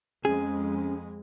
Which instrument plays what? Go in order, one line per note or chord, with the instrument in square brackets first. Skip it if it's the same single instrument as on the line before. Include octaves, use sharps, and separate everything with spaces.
[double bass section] F2 G#3 [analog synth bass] C#4 [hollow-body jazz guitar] G#4